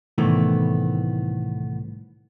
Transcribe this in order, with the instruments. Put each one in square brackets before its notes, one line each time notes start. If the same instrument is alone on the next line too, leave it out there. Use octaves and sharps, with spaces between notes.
[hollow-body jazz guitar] C2 A2 D#3 E3 A3 B3